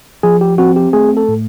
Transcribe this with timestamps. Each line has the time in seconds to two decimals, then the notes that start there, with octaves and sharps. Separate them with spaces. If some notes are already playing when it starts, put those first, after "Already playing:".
0.23 F3 G#4
0.41 G4
0.58 C4 F#4
0.76 G4
0.93 A3 G#4
1.17 A4
1.28 A2